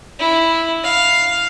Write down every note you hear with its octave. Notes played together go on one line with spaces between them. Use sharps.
E4
F5